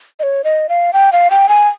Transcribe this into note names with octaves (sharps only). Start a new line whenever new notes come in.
D#5
C#5
D#5
F5
G5
F5
G5
G#5